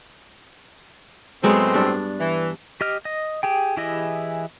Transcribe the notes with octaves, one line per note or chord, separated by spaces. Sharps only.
A2 F#3 G#3 B3 C4
G2 D4
E3
G4 D#5 F6
D#5
G4 G#4 G5
E3 E4 G4 G#4 D#5